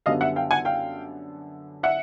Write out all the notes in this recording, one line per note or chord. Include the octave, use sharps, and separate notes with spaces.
F#2 D3 G3 B3 D#5 F5
E5 F#5
F5 G5
F#5 G#5
F5 G5
E5 F#5